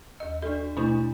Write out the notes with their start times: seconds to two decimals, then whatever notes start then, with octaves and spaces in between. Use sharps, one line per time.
0.20 D#2 D#5
0.42 D4 F#4 A4 D5
0.77 B2 A3 D4 E4